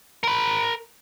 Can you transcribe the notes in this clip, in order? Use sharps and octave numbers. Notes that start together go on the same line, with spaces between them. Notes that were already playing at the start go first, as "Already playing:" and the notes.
A#4 B5